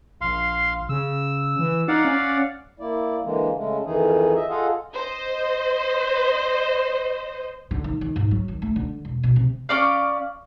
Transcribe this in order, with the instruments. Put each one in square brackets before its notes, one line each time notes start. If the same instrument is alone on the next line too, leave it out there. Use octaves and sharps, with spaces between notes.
[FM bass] A#1 [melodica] F5 C6
[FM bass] C#3 [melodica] E6
[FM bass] E3
[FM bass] D#4 [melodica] D5 F5 F#5
[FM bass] C#4
[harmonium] A#3 E4 D5
D3 E3 G#3 A#3
C#3 G#3 A3
F2 D#3 E3 D#4 G#4
D#5 E5
F4 G#4 A4 D#5 F5 F#5
[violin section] C5 D#5
[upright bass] D3
D#3
D#3
G#2
F#3
D#3
A3
D3
E1
B2
C3
[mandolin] C#4 D5 F5